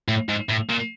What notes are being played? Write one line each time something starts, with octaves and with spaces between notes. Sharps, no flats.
A2
G#2
A2
A#2